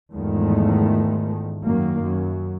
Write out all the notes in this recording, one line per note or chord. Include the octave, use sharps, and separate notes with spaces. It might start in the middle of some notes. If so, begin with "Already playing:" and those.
E2 G#2 D#3 F3 G#3 A3
F#2 D#3 A#3
F#2